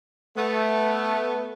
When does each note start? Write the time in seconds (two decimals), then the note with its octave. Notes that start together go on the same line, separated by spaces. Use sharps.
0.37 A3 B3